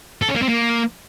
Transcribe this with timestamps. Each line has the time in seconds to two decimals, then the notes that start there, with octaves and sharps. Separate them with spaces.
0.22 A4
0.29 C#4
0.35 A#3
0.42 C4
0.49 A#3